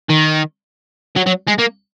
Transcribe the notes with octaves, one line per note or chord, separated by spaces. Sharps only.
D#3
F#3
F#3
G#3
A#3